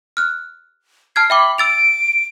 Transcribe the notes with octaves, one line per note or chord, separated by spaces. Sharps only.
F6 F#6
A5 F6 G#6 C7
E5 G5 B5 D6
E6 A6 D7 F7